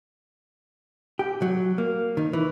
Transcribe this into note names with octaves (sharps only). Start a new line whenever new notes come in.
G4
F#3
A#3
D#3
E3